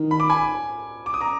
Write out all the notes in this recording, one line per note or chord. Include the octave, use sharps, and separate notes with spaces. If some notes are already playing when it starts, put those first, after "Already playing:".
Already playing: D#3
B5
D6
G#5 B5
D6
D#6
A#5 D6